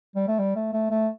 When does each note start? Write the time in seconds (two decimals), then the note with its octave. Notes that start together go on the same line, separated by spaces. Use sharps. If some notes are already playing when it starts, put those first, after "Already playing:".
0.16 G3
0.28 A3
0.39 G3
0.56 A3
0.73 A3
0.90 A3